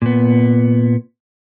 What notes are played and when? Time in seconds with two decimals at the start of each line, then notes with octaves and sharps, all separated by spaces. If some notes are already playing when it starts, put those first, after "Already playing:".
0.02 A#2 B3